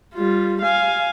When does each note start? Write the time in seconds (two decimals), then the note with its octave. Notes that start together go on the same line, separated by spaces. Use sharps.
0.14 G3 F4
0.62 F5 G#5